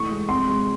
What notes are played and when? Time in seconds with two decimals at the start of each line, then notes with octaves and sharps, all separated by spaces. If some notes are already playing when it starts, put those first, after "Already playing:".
Already playing: E3 A3 C#6
0.11 G#3
0.29 C4 C6
0.48 G#3